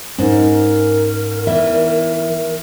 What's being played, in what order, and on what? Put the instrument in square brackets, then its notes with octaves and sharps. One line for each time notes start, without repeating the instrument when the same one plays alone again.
[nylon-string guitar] G#2 [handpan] C#4 D#4 [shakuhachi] A#4
[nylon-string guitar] E3 B3 [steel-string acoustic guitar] E5